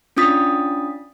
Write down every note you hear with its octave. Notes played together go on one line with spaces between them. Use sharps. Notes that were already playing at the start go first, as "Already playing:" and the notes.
C#4 D4 F4 D#6 A6 B6